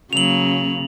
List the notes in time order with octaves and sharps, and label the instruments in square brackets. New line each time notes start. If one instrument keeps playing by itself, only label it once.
[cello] C#3 [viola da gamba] F#3 A#3 [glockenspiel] F7 F#7